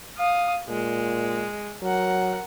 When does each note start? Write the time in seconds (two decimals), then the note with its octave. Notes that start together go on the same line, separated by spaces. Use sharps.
0.17 F5 D#6
0.69 A#2 G#3
1.82 F#3 A#4 F#5